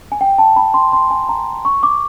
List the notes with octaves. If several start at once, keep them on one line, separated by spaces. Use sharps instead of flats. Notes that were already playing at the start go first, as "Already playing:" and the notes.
G#5
G5
A5
B5
C6
C6
G#5
A#5
C#6
D6